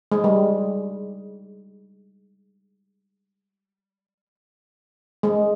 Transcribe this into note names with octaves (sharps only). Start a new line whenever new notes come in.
G#3
G3
G#3